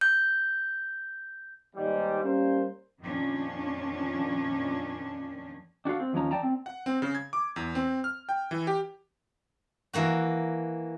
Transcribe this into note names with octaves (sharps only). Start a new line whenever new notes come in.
G6
D#2 G#2 G3
G3 A#3 C#4 A#4 C5
F2 A#2 D#3 F3 C#4 D4
D4 F#4 A4 F5
C4
D#2 F3 C#4 A#5
D5 G5 A5 A#5
C4
F#5
C4
C#3
G#6
D6
E2
C4
F6
G5
E3
G4
E3 A#3 F#4